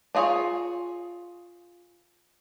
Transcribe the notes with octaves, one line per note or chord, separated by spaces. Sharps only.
D4 F4 G#4 C#5 F5